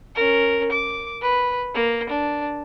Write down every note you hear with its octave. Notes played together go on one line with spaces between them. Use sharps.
C#4 A#4
D6
B4
A#3
D4